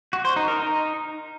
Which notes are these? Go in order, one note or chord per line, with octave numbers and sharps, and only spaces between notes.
F#4
C5
D#4
A#4
D#4